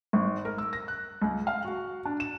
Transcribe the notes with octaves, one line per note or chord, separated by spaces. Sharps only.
G#1
A#4
E6
A#6
F#6
C#2
F5
F#4
D4
E7